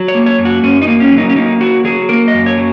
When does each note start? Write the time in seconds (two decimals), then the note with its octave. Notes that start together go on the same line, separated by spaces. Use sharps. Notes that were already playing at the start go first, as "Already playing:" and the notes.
Already playing: F#3
0.08 C#5
0.15 A#3
0.26 C#5
0.38 F#2
0.45 F#4
0.63 F#2 C#4
0.82 D#4
0.88 A#3
1.00 C#4
1.12 F#3
1.18 D#4
1.29 C#4
1.36 A#3 D#4
1.61 F#3 F#4
1.85 F#3 G#4
2.09 A#3 A#4
2.28 D#5
2.34 F#2
2.46 C#5
2.58 F#3